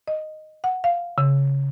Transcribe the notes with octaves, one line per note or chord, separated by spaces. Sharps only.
D#5
F#5
F5
C#3